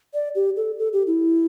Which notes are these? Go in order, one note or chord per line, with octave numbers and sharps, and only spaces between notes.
D5
G4
A4
A4
G4
E4